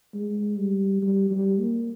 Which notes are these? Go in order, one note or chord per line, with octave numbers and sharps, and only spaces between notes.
G#3
G3
G3
G3
A#3